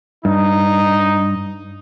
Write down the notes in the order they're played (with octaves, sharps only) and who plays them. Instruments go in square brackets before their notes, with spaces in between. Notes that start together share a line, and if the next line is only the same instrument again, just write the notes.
[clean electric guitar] G2 [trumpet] D#4